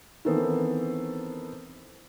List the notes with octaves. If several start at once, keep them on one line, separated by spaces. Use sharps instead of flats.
D#3 E3 B3 C4 A4 C5